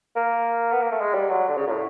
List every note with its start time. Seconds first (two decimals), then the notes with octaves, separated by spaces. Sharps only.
0.16 A#3
0.72 B3
0.82 A#3
0.92 A3
1.01 G#3
1.14 G3
1.30 F#3
1.49 D3
1.57 C#3
1.67 A#2
1.71 A2